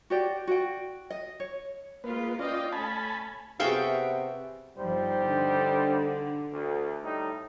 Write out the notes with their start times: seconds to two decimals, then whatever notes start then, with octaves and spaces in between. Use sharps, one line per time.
0.10 F#4 G4 D5
0.47 F#4 D5 G5
1.10 D#5
1.40 C#5
2.04 G#3 A#3 F4 B4
2.39 C#4 F4 D5 D#5 F5 G5
2.72 A3 C#4 G#5 A5 B5
3.60 C3 B3 F#4 G#4 A4 E5 F5 G5
4.76 G1 F3 G3 D#4 C5
5.23 D3
6.51 D2
7.03 A2 G3 D#4